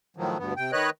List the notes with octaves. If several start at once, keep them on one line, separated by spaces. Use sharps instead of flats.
A2 D#3 F3 F#3
D2 G2 B3
C3 G5
D#3 B4 C#5 D#5 F#6